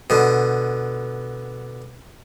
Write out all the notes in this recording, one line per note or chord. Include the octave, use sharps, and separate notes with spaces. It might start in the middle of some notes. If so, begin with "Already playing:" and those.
B2 D3